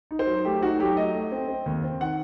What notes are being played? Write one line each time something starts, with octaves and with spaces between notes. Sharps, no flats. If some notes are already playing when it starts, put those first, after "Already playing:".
D#4
C5
F#3
A3 G4
D#4 F#4
F#3 G4
A3 D#5
A3
C4
C4
D#2
C4
D#3 F#5